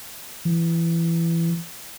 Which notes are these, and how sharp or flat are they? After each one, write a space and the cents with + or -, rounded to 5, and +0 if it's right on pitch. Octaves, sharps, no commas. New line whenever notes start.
E3 +20